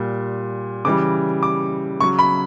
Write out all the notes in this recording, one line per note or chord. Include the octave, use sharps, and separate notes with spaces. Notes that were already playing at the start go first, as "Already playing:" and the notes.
Already playing: A#2 G3
C#3 E3 G3 D6
D6
C#3 F#3 C#6
B5